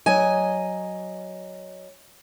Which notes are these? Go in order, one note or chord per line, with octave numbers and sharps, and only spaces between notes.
F#3 D#5 G#5